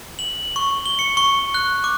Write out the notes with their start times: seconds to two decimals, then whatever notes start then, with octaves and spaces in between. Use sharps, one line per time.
0.19 F#7
0.56 C#6
0.86 G7
0.99 C#7
1.17 C#6
1.54 F#6
1.84 D6